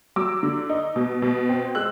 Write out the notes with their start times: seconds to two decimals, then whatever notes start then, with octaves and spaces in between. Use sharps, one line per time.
0.16 F#3 D6 E6
0.43 D3
0.69 D#4
0.96 B2
1.22 B2
1.49 C4
1.75 G#3 E6 F#6